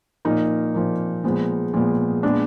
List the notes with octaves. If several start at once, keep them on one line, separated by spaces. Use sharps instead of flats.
A#2 F3 A#3 D#4
A#2 F3 A#3
A#2 F3 G#3 B3
A#2 F3 G#3 B3
A#2 G#3 B3 D4